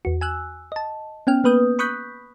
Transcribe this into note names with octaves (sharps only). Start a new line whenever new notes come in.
E2 F#4
G#5 E6 F#6
D#5 A5
B3 C#4 G5 F6
A#3 B3 B4 D#6 G6
B5 C#6 D#6 F#6 G6 B6